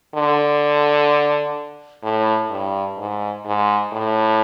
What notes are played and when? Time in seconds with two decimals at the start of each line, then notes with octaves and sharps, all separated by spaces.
0.15 D3
2.03 A2
2.50 G2
2.98 G#2
3.45 G#2
3.92 A2